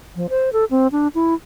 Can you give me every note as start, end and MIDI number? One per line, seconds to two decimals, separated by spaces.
0.16 0.27 53
0.30 0.50 72
0.53 0.65 69
0.71 0.88 60
0.92 1.08 62
1.15 1.34 64